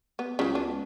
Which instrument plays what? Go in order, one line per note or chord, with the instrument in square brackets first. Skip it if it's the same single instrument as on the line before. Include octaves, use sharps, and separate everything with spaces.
[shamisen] B3
[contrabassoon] C#2 [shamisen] C#3 F#3
[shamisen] B3 D4